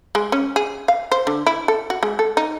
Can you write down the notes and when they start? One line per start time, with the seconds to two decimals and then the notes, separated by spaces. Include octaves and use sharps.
0.15 G#3
0.32 C#4
0.56 G#4
0.88 F5
1.12 C5
1.27 D3
1.47 E4
1.68 A4
1.90 F#4
2.03 G#3
2.19 A4
2.37 D#4